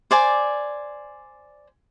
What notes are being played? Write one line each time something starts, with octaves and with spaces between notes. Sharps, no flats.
C5 D5 G#5